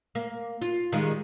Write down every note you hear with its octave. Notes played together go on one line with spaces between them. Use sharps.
A#3
F4
D#3 G3 G#3